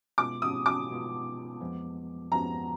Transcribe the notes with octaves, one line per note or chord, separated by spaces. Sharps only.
B2 G#3 B3 F4 D6
D#6
D6
B2 G#3 B3 F4
F2 F3 G#3 B3
F2 F3 G#3 B3 A#5